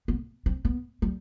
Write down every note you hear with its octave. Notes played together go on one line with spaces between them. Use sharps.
B3
C4
B3
G3